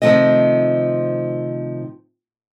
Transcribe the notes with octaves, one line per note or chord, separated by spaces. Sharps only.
C3 D#3 F3 A3 D#5